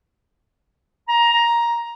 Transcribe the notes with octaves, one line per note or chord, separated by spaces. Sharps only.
A#5